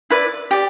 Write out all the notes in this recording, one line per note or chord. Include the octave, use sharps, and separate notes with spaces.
E4 B4 D5
G4 D5